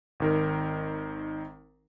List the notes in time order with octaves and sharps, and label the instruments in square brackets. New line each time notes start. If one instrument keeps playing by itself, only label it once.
[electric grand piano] G#1 D#3 A#4